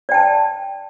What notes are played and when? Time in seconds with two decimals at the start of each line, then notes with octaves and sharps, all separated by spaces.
0.09 D5
0.12 G5
0.14 A5